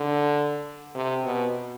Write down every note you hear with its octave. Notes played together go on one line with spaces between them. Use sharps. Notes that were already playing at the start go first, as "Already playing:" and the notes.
Already playing: D3
C3
B2